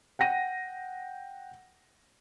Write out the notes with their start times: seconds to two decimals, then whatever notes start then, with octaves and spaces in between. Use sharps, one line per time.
0.19 F#5 G5 A#6 D#7